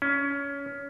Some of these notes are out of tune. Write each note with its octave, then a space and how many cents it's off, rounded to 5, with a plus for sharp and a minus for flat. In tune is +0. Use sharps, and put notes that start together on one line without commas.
C#4 +20